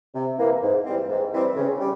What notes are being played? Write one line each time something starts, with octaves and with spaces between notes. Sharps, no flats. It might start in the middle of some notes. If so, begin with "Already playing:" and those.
C3
E3 A#3
G#2
E3 G3 C4
G#2
E3 G3 C4
C#3
G3